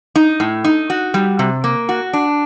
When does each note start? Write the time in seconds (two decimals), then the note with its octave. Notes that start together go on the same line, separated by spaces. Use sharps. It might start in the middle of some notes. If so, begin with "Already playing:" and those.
0.16 D#4
0.40 A2
0.64 D#4
0.90 F#4
1.14 G3
1.39 C3
1.64 A#3
1.89 F#4
2.13 D4